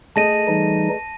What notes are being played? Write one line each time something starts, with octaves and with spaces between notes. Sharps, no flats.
A3 G#4 D#5 A5 A#6 D#7
E3 G3 D#4